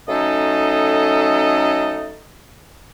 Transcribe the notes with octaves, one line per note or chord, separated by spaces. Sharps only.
F#3 A3 C#4 D#4 A4 D#5